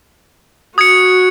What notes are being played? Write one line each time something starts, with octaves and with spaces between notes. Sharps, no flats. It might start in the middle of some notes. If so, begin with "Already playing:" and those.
F#4 D#6 G#6 C#7